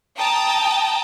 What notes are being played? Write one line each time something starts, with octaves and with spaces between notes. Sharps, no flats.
G5 A5 A#5 D#6